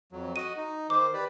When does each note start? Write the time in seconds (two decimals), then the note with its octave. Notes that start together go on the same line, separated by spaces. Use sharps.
0.12 F2 F#3
0.36 F#4 D#5 D#7
0.57 D#4
0.90 D#3 C5 D6
1.14 G4 B4 D5